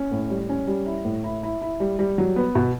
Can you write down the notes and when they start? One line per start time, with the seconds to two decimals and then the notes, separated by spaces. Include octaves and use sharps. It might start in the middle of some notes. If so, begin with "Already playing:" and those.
Already playing: C#4
0.11 A2
0.30 G3
0.50 C#4
0.67 G3
0.86 E4
1.05 A2
1.24 E4
1.43 E4
1.62 E4
1.80 G3
1.99 G3
2.18 F#3
2.36 B3
2.55 B2